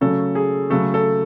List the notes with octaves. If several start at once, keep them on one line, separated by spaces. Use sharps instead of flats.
C#3 F#3 A3 C#4 A4
G#4
C#3 F#3 A3 A4
A4